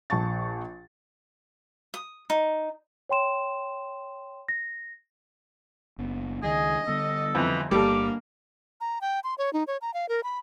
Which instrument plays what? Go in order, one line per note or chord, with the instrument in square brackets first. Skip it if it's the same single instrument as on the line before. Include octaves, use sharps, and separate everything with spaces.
[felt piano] A#1 A5 C#6 A6
[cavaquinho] D#6
D#4
[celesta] C#5 G5 C6 E7
A#6
[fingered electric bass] F#1 B3
[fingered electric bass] C#2 D#3 [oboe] G#4 [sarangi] D#5
[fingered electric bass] D3 G3 B3 [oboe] A4
[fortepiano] F2 [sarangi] E3
[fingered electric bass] G1 [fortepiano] G3 A4 [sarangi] A#3 [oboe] D6
[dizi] A#5
G5
C6
C#5
D#4
C#5
A#5
F5
A#4
B5